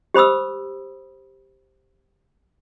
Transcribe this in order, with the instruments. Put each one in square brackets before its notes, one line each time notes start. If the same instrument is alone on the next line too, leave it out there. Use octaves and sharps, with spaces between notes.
[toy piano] G4 C5 B5 D#6 E6